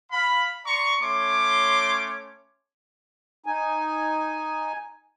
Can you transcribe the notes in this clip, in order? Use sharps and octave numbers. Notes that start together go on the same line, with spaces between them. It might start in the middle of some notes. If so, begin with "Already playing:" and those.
F5 B5
D5 A#5 C6 C#6
A3 C#4 C#5 C6 D6
D#4 G#5